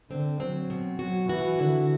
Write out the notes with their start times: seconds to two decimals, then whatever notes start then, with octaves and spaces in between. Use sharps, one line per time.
0.10 D3 C4
0.39 F#3 C4
0.70 B2
0.99 F#3 F#4
1.29 E3 F#4
1.59 D3 E4